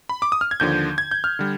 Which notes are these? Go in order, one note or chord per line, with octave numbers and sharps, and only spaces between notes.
B5
D6
D#6
F6
G#6
D#2 D3 F3 G6
G#6
G6
F6
D3 G3